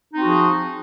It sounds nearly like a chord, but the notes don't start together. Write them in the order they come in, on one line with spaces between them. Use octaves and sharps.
D#4 C4 F#4 F3 G#4